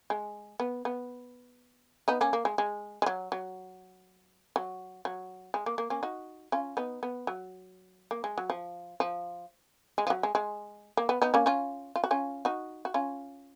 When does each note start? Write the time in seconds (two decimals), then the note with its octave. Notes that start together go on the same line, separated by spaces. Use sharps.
0.10 G#3
0.60 B3
0.85 B3
2.08 B3 D#4
2.21 A#3 C#4
2.33 A#3
2.45 G#3
2.58 G#3
3.02 G#3
3.06 F#3
3.32 F#3
4.56 F#3
5.05 F#3
5.54 G#3
5.66 A#3
5.78 A#3
5.90 A#3 C#4
6.03 D#4 F#4
6.52 C#4 F4
6.77 B3 D#4
7.03 B3
7.27 F#3
8.11 A#3
8.24 G#3
8.38 F#3
8.50 F3
9.00 F3
9.98 G#3
10.07 F3
10.10 F#3
10.23 G#3
10.35 G#3
10.97 A#3
11.09 B3
11.22 B3 D#4
11.34 A#3 C#4
11.46 C#4 F4
11.96 F4
12.04 F#4
12.11 C#4 F4
12.45 D#4 F#4
12.85 F#4
12.94 C#4 F4